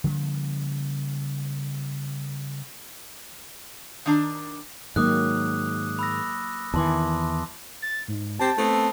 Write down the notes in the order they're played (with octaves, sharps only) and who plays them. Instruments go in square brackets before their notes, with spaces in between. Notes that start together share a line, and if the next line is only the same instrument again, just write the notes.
[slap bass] C#3 F3 G3 A#3
[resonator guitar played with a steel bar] D#3 D4 A#5
[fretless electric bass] G#2 D#3 [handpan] F#3 A#3 [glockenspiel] D6 D#6 F#6
[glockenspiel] B5 E6 A#6
[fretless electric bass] E2 E3 [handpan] D#3 [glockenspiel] A5 C6 D6
[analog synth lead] A6
G#2
[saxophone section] C4 G4 [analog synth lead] A5
[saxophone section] A3 B3 C4